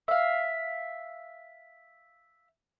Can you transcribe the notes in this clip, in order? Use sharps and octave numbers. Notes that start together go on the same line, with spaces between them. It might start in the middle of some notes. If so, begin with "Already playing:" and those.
E5 F5